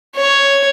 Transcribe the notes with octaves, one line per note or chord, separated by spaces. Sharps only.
C#5